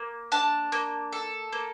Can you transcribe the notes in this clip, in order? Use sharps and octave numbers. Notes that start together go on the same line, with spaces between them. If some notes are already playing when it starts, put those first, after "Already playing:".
Already playing: A#3
D4 A5
A#3
A4
A#3